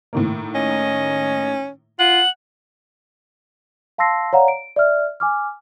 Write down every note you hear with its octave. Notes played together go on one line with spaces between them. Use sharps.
A2 D#3 A#3
C#4 D#5
F4 F#5 F#7
F5 A5 C6 E6 A#6 C7
C#5 D5 F5 F#5 A#5
D7
D5 E5 F6
G#5 D6 F6